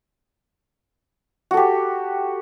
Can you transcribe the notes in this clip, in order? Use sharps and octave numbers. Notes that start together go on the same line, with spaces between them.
F#4 G4 A4